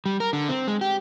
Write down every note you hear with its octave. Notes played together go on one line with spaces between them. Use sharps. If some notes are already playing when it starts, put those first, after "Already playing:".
G3
A#4
D3
C4
G#3
G4